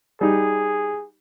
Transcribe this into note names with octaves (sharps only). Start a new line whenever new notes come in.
G3 D#4 G#4